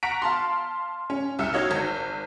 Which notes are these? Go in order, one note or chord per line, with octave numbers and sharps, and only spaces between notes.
F#5 A#5 C#6 B6 D7
F5 A5 C6
C#4
C2 E5 E6 F6 C#7
D#4 F#4 C#5 D#5 F5
G#1